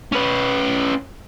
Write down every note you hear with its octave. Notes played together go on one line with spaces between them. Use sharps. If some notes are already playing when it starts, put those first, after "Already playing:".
C#4 B4